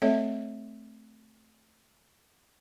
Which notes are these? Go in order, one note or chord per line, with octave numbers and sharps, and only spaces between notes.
A3 C4 A4 C#5 D#5 E5